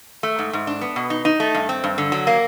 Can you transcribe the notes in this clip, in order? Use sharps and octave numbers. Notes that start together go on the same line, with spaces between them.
A3
G#2
G#2
D4
B3
B2
D#4
D#4
A3
G2
C4
G2
D3
F#3
A#3